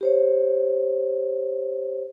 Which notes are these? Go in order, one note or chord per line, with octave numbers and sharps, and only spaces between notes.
G4 C5 C#5